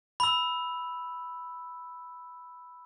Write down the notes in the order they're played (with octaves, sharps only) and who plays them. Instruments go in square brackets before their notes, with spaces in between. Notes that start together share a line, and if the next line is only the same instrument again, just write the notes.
[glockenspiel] B5 E6